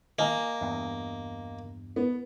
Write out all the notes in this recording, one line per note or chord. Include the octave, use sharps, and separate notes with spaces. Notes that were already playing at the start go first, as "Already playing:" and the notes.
A#3 D#5 G#5
E2 G2
B3